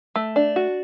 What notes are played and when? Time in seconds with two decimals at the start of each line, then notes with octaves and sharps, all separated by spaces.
0.16 A3
0.36 D4
0.56 F#4